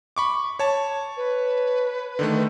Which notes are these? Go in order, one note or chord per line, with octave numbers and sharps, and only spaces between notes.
B5 C#6 D6
C#5 A5
B4
D3 D#3 A3